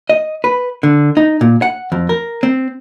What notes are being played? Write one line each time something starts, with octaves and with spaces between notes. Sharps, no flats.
D#5
B4
D3
D#4
A#2
F#5
F2
A#4
C4